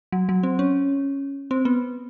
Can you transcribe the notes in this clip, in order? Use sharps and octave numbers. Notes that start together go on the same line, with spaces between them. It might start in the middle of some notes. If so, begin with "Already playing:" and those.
F#3
F#3
C4
C#4
C4
B3